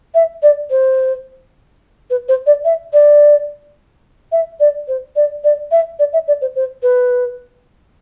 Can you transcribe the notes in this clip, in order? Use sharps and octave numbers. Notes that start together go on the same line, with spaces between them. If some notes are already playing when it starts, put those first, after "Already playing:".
E5
D5
C5
B4
C5
D5
E5
D5
E5
D5
C5
D5
D5
E5
D5
E5
D5
C5
C5
B4